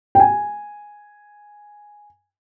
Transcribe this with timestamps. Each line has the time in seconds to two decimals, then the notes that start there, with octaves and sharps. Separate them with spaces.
0.15 G5
0.20 G#5